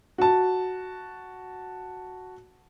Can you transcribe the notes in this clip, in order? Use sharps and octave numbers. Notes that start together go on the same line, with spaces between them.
F#4 A5